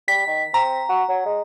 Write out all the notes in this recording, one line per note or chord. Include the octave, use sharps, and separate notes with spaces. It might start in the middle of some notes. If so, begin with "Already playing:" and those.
G3 B6
D#3
C4 A#5
F#4
F#3
G#3